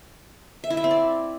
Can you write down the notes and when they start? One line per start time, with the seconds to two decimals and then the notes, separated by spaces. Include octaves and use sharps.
0.64 E5
0.70 E4
0.77 E5
0.84 C4
0.91 D5